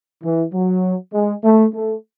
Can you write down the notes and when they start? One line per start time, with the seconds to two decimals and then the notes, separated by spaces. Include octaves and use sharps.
0.23 E3
0.53 F#3
1.13 G#3
1.43 A3
1.74 A3